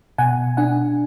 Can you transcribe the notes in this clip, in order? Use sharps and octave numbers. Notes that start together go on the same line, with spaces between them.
B2 F#5 G#5
D4 F#5 G#5